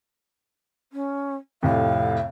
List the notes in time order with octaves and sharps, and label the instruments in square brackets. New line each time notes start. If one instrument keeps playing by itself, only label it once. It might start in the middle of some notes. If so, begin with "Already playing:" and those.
[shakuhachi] C#4
[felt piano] F2 A2 C3 [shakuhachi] F5